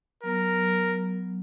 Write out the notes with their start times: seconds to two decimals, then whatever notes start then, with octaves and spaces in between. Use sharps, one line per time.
0.23 F#3 B3 A#4